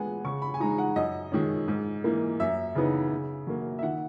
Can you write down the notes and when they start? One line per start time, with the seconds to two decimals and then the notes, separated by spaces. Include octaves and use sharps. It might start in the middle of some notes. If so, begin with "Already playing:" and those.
Already playing: A#2 G#3 B3 F#5 G#5
0.24 C#3 C#6
0.42 B5
0.54 G#5
0.60 G#3 D#4 A#5
0.78 F#5
0.96 F#2 D#5
1.32 D#3 G#3 C#4
1.68 G#2
2.04 E3 A#3
2.40 F#2 E5
2.75 C#3 E3 B3 D#4
3.11 C#3
3.47 F#3 A#3
3.79 E5
3.83 D#3 F#5